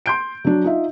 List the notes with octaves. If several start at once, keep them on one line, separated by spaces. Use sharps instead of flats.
C6 G6 D7
F#3 D4
D#4 F4 E5